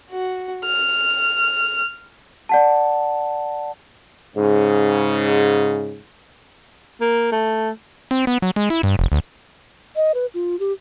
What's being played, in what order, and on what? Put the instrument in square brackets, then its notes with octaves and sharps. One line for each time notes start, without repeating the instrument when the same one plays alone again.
[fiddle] F#4
F6
[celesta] D5 F#5 A5
[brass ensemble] G#2 C#3
[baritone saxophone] A#3
A3
[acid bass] C4
B3
F#3
G#3
E4
G2
F1
D2
[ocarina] D#5
B4
F4
G4